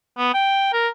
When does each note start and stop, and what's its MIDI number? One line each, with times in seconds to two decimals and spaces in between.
0.18 0.33 59
0.34 0.72 79
0.73 0.88 70